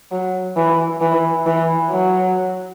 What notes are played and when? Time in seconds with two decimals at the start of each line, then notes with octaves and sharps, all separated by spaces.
0.12 F#3
0.57 E3
1.01 E3
1.46 E3
1.91 F#3